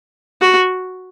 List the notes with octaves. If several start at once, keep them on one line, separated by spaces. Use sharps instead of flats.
F#4